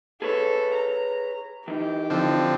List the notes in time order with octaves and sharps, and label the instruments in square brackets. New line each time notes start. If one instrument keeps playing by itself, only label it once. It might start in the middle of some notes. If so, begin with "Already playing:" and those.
[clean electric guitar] G#4 B4 C#5 [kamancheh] A4
[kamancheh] A#5
[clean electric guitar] E3 D#4 [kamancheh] G4
[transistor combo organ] D3 F3 C4